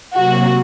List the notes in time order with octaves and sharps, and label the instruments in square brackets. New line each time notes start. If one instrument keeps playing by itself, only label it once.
[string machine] C3 F#3 A#3 [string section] F#4